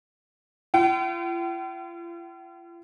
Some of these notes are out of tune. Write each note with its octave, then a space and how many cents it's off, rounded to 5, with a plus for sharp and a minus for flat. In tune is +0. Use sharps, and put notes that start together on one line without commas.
F4 -45 G5 -40